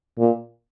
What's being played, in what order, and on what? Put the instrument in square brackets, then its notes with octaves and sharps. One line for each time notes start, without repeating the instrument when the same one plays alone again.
[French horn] A#2